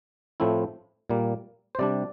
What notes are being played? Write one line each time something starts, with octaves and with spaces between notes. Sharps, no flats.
A2 F3 A3 C4 E4
A#2 G3 A#3
C5
C3 G3 D4 D5